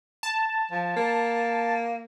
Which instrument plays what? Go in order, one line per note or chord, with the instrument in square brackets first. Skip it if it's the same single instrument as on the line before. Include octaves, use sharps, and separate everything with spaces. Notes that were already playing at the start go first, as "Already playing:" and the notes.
[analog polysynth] A5
[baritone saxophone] F3
A#3